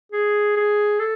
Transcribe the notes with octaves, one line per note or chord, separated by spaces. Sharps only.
G#4
G#4
A4